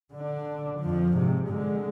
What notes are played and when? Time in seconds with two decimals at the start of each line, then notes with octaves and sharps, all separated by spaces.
0.13 D3 D4
0.80 F2 F3
1.13 G#2 C3
1.49 D3 G#3